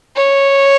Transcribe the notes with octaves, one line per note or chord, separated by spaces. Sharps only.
C#5